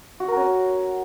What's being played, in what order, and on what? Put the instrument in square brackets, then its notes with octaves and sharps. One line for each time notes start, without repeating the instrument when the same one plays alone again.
[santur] F#4
A#4
C#4